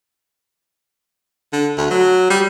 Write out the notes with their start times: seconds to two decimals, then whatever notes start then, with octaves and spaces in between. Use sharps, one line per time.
1.53 D3
1.78 D2
1.90 F#3
2.30 G3